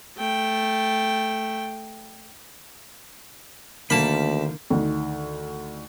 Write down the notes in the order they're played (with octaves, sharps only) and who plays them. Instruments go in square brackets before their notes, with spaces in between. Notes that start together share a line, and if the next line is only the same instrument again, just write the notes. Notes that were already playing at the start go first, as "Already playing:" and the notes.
[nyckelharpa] A3 G5
[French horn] D2 [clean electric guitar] D3 D#3 [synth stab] A#3 [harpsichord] A5 B5
[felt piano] D2 D#3